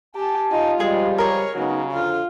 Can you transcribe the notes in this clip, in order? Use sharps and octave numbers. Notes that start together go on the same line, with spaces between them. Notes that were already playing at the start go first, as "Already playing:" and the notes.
G4 G#5 A5
D#4 F4
C#2 F3 G3 G#3 G#4
G#4 A#4 C#5
C#3 F#3 G#3 B3 D#4
F2 D3 F4